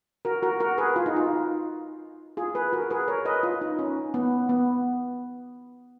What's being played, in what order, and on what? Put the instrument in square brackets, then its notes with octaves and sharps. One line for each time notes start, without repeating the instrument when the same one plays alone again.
[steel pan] F#4 A#4
F#4 A#4
F#4 A#4
G#4 B4
F4
D#4
F4
F4 G#4
G#4 B4
F#4 A#4
G#4 B4
A#4 C#5
B4 D#5
F4
D#4
C#4
B3
B3